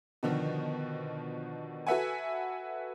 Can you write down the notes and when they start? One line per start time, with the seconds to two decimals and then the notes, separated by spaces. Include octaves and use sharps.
0.23 B2 D3 D#3 F3
1.87 F#4 A4 B4 E5 F#5 G#5